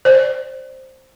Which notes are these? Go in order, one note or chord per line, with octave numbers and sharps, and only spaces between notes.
C5 D5